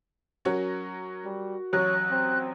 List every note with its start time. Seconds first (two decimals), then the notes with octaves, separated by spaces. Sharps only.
0.45 F#3 C#4 F#4 A#4
1.25 G3
1.73 A1 F#3 C#5 F#6
2.11 C4